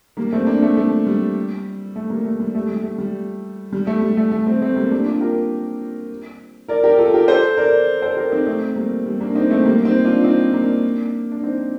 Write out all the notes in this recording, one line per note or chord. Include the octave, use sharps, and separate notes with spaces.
G3 A#3
A3 C4
A#3 D4
A3
A3
G3
A3
G3 A#3
A3
G3
A3
G3
A3
G3
G3
A3
G3
A3
A3
A3 C4
A3 C4
G3 A#3
A#3 D4
D4 F4
G4 A#4
A#4 D5
G4 A#4
F4 A4
G4 A#4
A4 C5
A#4 D5
A4 C5
G4 A#4
C4 D#4
A3 C4
G3 A#3
G3
A#3 D4
C4 D#4
A3 C4
G3 A#3
C4 D#4
D4 F4
C4 D#4
A#3 D4
D4
C4 D#4